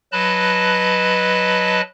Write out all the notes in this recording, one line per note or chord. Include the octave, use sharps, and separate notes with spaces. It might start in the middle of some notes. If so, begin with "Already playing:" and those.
F#3 B4 D#5 A5 B5 F#6